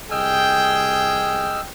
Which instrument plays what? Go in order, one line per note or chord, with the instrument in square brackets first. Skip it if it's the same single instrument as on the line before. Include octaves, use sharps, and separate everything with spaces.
[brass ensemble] C2 G#4 G5 [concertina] D#5 E6 F6